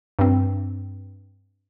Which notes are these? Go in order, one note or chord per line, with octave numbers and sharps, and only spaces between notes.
G2 C4